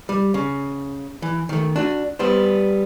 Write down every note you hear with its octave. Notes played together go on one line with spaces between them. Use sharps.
G3
C#3
E3
D#3 A3
D4 F#4
G3 B3 C5